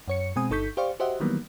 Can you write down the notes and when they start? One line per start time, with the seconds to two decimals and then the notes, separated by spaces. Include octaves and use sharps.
0.08 F#2 C#5 C#7
0.36 B2 G#3 C4 G#5 D#6
0.50 G1 D#4 A4 C#6 G6 B6
0.77 G4 C5 D5 F5 C#6
1.00 F#4 G4 C5 D#5 E5 F#5
1.20 D#3 E3 F#3 G3 A#3 B3